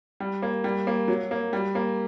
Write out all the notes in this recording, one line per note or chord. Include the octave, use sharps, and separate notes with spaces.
G3
A#3
G3
A#3
F#3
A#3
G3
A#3